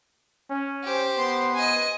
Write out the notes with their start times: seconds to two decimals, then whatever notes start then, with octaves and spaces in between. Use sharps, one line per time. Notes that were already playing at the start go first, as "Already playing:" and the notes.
0.50 C#4
0.83 G4 C5
1.18 B3 C6
1.54 D#5 G#5